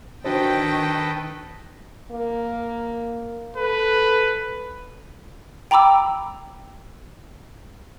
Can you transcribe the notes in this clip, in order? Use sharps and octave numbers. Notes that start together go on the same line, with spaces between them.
D#3 D4 F#4 A4 B4 C5 D#5 G5
A#3
A4 B4
G5 A#5 B5 D6 E6